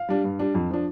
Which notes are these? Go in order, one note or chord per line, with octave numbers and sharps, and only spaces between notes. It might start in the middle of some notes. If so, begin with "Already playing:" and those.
Already playing: F5
G3 D4
G2
G3 D4
F2
F3 D4